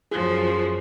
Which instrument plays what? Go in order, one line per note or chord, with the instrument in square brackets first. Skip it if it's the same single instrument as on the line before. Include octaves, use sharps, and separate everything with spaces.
[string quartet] F#2 F3 [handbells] G#4